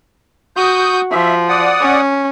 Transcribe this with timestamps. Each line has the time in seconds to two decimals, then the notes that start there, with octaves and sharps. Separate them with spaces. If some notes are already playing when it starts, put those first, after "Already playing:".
0.56 F#4 D#6 G6
1.11 F3 E5
1.49 D5 F#5 D#6
1.81 C#4